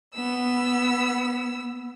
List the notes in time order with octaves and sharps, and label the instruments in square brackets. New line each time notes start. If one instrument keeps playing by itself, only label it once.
[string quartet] B3 E6